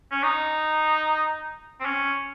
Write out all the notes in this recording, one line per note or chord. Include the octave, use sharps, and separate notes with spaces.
C#4
D#4
C4
C#4